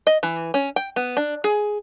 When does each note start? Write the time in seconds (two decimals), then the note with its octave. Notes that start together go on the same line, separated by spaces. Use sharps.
0.07 D#5
0.23 E3
0.54 C#4
0.76 G5
0.96 B3
1.17 D4
1.44 G#4